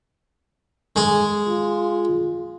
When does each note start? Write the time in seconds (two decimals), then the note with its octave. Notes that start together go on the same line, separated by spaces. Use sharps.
0.96 G#3 G#4
1.48 F4